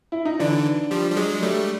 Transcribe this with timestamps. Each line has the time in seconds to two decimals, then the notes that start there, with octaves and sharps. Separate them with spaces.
0.12 E4
0.25 D#4
0.39 D3 E3 D4
0.91 F3 G3
1.11 G3
1.17 F#3 G#3
1.43 G3 A3